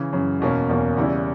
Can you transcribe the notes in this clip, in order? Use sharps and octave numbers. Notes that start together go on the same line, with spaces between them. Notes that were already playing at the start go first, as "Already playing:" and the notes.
Already playing: C#3 E3
F#2 C#3 E3
E2 B2 A#3 C#4
E2 B2 A#3 C#4
E2 C#3 G3 C#4 E4